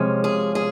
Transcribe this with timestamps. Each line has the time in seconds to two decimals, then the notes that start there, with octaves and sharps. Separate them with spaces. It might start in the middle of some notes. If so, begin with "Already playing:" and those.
Already playing: C3 F3 G#3 C#4
0.24 G#4
0.55 G#4